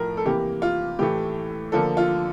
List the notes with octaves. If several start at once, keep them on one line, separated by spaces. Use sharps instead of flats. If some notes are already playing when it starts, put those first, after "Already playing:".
Already playing: A2 F3 A3 A#4
A4
C3 E3 A#3 G4
F4
A2 E3 A3 G4
D3 F3 A#3 A4
F4